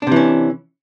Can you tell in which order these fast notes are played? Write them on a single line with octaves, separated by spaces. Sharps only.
D4 C3 E3 C#4